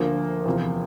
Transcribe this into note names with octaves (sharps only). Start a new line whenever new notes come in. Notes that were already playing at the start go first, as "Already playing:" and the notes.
Already playing: D2 D3 F3 A#3
E2 C3 F3